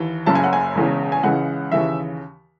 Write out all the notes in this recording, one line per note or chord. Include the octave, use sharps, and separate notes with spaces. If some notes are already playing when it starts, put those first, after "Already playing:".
Already playing: D#2 E3
F#1 F#2 C#3 A5
G#5
F#5
G#5
E1 E2 C#3
G#5
C#2 C#3 E3 F#5
D#2 C#3 E3 E5